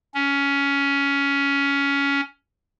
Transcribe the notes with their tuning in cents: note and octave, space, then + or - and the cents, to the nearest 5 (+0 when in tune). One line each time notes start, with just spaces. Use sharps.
C#4 +15